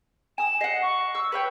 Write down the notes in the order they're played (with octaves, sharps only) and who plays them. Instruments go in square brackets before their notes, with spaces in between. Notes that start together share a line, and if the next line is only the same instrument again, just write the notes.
[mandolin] G#5 D#6 [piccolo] E7
[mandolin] D#5 F#5 [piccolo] C7
[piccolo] C#6
[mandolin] E6
[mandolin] B4 C#5 G5 [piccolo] E6